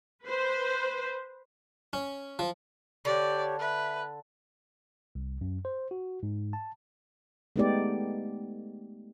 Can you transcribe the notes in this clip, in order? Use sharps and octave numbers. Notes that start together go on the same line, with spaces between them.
B4 C5
C#4
F3
D3 G4 C#5 D5 C#6
B4 E5
C2
F#2
C5
F#4
G#2
A5
G#3 A3 B3 D#4 G4 D5